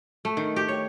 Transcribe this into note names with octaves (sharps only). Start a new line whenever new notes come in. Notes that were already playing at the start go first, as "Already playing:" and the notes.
A3
D#3
G4
C#5